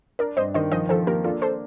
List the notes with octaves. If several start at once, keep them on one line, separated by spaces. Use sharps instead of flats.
D4 A#4 D5
G2 C5 D#5
D#3 C5 D#5
F3 C5 D#5
F3 A4 C5
A#3 G4 A#4
D4 F4 A4
A4 C5